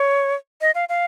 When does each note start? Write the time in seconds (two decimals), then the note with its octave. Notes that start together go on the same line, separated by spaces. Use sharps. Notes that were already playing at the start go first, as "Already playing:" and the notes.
Already playing: C#5
0.61 D#5
0.75 F5
0.89 F5